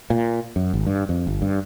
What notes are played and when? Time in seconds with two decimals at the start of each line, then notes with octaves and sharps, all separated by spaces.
0.10 A#2
0.56 F#2
0.74 G#1
0.87 G2
1.09 F2
1.27 G1
1.42 G2